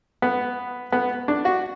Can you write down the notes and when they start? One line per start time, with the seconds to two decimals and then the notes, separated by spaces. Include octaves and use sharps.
0.22 B3
0.92 B3
1.28 D4
1.45 F#4